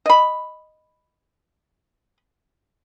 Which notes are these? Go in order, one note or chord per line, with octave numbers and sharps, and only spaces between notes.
D#5 B5